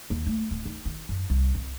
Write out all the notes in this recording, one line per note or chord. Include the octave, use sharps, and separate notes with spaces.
D#2
A3
D1
D#4
D#3
F#2
C2
F2